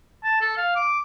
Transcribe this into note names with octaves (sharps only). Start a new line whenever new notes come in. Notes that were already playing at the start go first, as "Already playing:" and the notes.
A5
A4
F5
D6